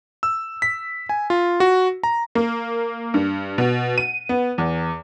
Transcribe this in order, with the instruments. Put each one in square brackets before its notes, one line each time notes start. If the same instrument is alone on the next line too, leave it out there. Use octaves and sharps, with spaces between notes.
[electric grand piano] E6
B6
G#5
F4
F#4
A#5
[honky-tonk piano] A#3
G2
B2
D#7
B3
E2